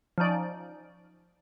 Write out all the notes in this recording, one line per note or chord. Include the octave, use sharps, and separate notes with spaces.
F3 C#4 D#4 D5